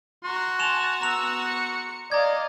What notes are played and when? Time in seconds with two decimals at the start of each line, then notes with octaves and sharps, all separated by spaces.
0.24 F#4 A#5 C6
0.59 G#5 A5 C6 E7 F7
1.02 B3 A#5 E6 F7
1.48 C#7
2.12 D5 D#5 F5 A#5 G#6